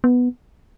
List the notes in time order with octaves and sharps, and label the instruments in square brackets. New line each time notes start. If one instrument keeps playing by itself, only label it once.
[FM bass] B3